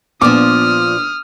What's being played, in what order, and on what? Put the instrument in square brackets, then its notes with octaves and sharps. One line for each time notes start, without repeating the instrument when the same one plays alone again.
[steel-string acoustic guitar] A#2 F3 [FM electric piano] B3 D4 [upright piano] D6 [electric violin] D#6 F6